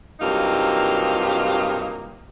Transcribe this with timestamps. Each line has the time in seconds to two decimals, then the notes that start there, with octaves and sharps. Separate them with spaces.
0.20 G2 C3 F#3 A#3 D#4 F4